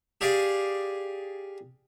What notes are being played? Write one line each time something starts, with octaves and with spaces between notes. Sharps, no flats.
G4 G#4 D5 F5